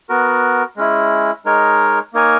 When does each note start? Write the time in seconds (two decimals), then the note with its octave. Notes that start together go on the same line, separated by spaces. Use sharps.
0.09 B3 F#4 A#4
0.76 G#3 C#4 E4
1.45 G#3 D#4 A#4 C#5
2.13 A#3 D#4 A#4 C#5 G#5